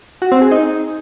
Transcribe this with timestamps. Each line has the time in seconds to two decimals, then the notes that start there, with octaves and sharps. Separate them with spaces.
0.22 F#4
0.32 C4
0.41 G#4
0.51 D#4